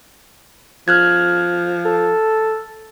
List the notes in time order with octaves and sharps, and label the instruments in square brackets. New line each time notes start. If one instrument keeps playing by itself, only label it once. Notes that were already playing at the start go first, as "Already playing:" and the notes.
[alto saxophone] F3 [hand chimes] F6 F#6 G#6
[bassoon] A4